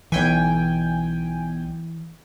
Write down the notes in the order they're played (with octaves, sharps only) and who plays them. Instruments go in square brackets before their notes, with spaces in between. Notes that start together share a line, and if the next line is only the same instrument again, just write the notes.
[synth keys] B1 G5 G#5 [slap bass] E3